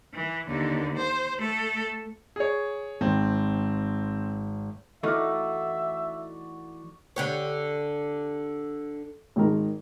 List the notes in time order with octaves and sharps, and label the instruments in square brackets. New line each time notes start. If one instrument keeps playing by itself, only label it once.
[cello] E3
D#2 D3
C5
A3 A4
[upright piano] G#4 C#5
[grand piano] G#1 [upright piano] C4
[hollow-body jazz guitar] E3 A3 D#4 [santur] F#4 D5 [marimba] A4 F6 [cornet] E5
[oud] D3 G4 C#5
[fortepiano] G#1 D#3 A#4